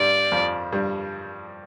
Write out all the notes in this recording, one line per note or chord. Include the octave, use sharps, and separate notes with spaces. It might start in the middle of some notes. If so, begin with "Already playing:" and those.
Already playing: G2 G3 D5
F2 F3
G2 G3